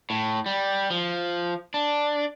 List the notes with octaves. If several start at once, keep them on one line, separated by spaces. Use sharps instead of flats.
A2
G3
F3
D4